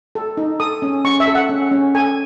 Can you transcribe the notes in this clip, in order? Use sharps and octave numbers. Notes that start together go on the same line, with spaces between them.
A4
D#4
A4 D#6
C#4
C#4 C#6
E5
A4
F#5
C#4
C#4
A4 G#5